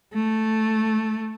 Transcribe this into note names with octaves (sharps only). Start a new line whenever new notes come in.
A3